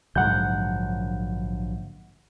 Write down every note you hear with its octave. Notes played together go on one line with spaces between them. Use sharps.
A#1 G#2 D3 F#3 F#5 G6